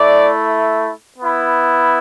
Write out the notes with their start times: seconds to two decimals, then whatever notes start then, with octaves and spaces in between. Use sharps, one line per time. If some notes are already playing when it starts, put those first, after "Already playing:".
Already playing: A3 E4 D5
1.18 B3 E4